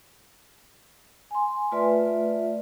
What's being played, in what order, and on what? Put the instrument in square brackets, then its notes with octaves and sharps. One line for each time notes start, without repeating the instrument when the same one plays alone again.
[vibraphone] G#5 C6
A3 F4 B4 D5 E5